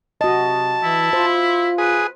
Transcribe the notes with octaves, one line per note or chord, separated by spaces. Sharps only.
C3 F#4 D#5 A5
E3 E4
F4 C5
G#4 B4